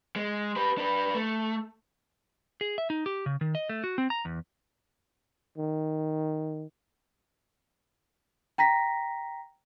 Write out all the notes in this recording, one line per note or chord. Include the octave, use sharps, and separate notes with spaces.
G#3
G4 B4
D4 B4
A3
G#4
E5
D#4
G4
C#3
D#3
D#5
A3
F#4
C4
A#5
E2
D#3
G5 A#5 A#6 B6